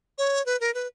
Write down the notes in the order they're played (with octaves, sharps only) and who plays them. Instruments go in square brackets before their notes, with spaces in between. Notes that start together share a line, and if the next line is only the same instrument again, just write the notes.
[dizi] C#5
B4
A#4
B4